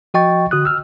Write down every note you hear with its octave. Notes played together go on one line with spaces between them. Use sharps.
F3 F#4 D#5 G5 C#6 A6
D3 F#4 D#6 F#6
E6 F6